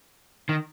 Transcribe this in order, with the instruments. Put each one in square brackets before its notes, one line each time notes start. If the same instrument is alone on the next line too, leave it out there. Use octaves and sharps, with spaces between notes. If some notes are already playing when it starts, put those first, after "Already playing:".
[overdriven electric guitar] D#3